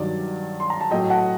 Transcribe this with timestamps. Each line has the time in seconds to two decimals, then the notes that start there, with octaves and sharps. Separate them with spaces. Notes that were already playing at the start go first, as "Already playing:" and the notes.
Already playing: G2 D#3 F#3 D5
0.60 C6
0.70 A#5
0.81 A5
0.91 A2 F#3 A3 D#5 G5
1.10 F#5 A5